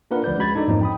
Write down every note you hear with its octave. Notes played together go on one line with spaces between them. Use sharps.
A#3 D4 F4 A#4 B4 F#5
D2 F3 B4 D5 G6
G#3 C#4 F#4 B5 G#6 A6
D4 D#4 A4 D5
F2 G#2 F3 F#3 A#3 D#4
G5 B5 D#6